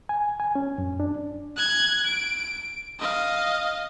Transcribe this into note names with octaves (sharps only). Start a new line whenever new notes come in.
G#5
G#5
C#4
F#2
D4
F#6 G#6
D7
D#5 F5